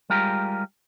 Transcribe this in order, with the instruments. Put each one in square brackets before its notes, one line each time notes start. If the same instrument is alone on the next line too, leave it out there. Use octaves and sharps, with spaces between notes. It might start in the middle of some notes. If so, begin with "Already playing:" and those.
[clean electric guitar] G3 G#3 F4 G4 A#4